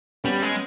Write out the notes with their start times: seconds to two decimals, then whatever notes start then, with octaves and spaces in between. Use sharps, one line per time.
0.24 G3 B3 C#4
0.42 G#3